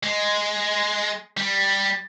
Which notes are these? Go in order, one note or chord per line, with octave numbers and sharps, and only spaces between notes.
G#3
G3